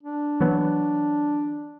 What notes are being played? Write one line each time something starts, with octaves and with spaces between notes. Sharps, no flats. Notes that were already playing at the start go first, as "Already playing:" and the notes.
D4
E3 F#3 B3